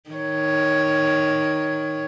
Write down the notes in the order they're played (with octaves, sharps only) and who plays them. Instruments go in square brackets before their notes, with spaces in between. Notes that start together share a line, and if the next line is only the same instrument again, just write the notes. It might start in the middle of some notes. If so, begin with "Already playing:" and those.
[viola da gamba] D#3 C#5